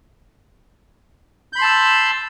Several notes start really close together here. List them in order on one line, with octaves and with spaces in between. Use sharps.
G6 B5 C6 A5 E6